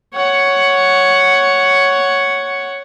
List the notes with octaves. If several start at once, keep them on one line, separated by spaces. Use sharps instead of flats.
C#5 F#5